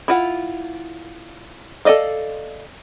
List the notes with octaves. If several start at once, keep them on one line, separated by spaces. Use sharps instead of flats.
E4 F4 F#5
A4 A#4 D5 D#5 F5